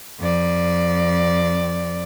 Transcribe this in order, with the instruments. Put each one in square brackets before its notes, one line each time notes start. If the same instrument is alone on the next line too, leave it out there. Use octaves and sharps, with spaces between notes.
[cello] F2 D5